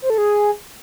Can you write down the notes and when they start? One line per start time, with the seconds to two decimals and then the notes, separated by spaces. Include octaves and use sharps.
0.02 C5
0.10 A4
0.18 G#4